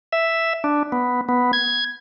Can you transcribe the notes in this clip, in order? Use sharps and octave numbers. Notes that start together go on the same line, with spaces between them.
E5
D4
B3
B3
G#6